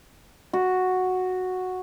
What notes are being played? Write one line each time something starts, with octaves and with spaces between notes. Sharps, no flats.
F#4